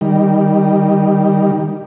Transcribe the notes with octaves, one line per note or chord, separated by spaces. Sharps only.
D#3 G3